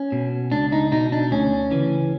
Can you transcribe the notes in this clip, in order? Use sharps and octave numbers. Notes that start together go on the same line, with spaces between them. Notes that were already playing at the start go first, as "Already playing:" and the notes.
Already playing: C#4
B2
C#2 D4
D#4
B2 D#4
D4
D2 C#4
C#3 E3